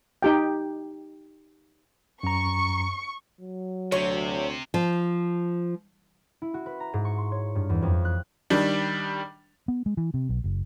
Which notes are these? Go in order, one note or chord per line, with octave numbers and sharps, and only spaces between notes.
D#4 G4 G5
F#2 A#5 C#6
F#3
D2 C3 C#5
F3
E4
F#4
B4
A#5
G#2
C#6
C6
C#5
G2
E2
F2
F#6
D#3 G3 D4
B3
G#3
E3
C3
B1
F#1